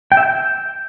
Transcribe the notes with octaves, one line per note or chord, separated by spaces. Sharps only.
G5
E5
G6